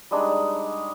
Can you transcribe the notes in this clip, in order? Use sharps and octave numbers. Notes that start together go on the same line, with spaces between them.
G3 G#3 D4 D#4